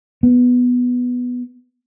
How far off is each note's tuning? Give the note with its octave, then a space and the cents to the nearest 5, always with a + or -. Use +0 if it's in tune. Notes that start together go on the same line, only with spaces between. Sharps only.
B3 +0